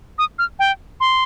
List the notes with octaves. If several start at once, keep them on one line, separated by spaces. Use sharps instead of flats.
D#6
F6
G5
C6